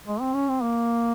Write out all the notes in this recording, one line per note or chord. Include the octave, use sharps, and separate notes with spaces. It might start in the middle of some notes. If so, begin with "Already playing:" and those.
G#3
C4
C#4
C4
A#3